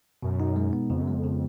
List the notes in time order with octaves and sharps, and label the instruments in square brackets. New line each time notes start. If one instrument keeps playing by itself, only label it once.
[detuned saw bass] F#2 [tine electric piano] B2
[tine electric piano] D#4
G#3
B3
[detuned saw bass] F2 [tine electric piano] C#3
[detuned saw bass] F#2
[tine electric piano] G#3
[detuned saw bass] F2
[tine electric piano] C#3